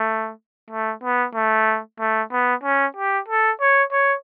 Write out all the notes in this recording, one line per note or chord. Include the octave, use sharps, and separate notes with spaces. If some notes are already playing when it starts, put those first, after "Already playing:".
Already playing: A3
A3
B3
A3
A3
B3
C#4
G4
A4
C#5
C#5